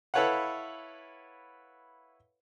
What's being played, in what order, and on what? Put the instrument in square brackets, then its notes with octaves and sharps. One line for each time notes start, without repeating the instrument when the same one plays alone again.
[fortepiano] E4 A4 B4 C#5 F5 F#5